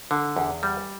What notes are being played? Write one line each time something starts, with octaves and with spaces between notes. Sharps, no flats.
D3
E2
G3